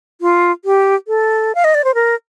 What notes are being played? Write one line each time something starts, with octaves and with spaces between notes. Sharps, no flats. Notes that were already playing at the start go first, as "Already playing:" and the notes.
F4
G4
A4
F5
D#5
D5
C5
A#4